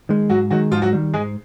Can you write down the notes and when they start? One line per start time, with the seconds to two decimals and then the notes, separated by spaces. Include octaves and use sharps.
0.09 D#3 G#3
0.29 G#2 F#3 F#4
0.50 D#3 F#3 G#3 F#4
0.72 G#2 F3 F4
0.82 F#3 F#4
0.93 D#3 G3
1.14 G#2 G#3 G#4